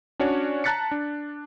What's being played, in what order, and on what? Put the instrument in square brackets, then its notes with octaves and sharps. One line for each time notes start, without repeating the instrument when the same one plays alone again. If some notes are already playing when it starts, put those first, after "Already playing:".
[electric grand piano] C#4 D4 F#4 C#5 D5
A5 A#5 F#6 A6 B6 C#7
D4